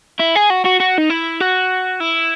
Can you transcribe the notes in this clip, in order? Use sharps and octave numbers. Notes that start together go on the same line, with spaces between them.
E4
G#4
F#4
F#4
F#4
D#4
E4
F#4
E4